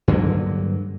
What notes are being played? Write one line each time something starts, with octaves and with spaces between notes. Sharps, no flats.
G2 D3 F#3 A#3